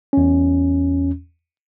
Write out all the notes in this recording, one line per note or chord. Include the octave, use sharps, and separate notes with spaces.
E2 C#4